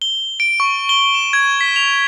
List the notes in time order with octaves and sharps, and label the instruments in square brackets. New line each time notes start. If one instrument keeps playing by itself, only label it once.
[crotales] G7
D7
C#6
G7
E7
G#6
B6
F7